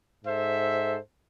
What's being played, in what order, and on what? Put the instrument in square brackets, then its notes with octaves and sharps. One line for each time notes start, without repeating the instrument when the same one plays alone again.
[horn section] G#2 A4 C5 E5